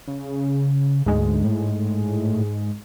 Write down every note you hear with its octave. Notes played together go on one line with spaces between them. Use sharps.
C#3
D2 G#2 G#3
A2